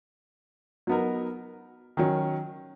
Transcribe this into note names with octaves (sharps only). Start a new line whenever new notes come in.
F#3 B3 D#4 A#4
D#3 F#3 C#4